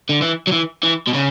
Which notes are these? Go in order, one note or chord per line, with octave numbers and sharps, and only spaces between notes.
D3
E3
F#3
E3
E3
B2
C#3